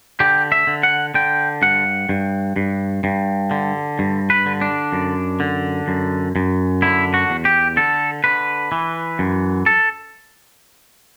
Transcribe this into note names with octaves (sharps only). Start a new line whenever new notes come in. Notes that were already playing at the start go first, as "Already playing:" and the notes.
D3 G4
E5
D3
F#5
D3 G5
G2 F#5
G2
G2
G2
D3
G2
B4
D3
D4
F#2
D3
F#2
F#2
D3 E4
F#4
E2
G4
D3 A4
D3 B4
E3
F#2
A4